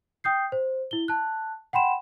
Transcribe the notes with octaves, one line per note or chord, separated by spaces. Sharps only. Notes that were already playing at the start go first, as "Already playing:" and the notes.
G5 D#6 G6 C7
C5
E4 G7
A5 F#6
F#5 G5 B5 C6 E7